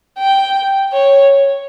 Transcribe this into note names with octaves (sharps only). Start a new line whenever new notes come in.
G5
C#5